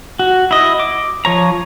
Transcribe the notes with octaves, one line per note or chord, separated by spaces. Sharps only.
F#4
E4 D#5
D6
F3 C#5 A#5